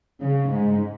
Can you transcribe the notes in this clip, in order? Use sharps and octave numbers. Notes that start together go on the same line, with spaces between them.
C#3
G#2